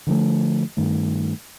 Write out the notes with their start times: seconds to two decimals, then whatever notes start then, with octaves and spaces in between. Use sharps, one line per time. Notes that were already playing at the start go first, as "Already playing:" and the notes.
0.07 D3 F3 A3
0.77 G2 D#3 A3